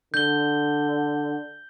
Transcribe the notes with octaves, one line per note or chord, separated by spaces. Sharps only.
D3 G6 G7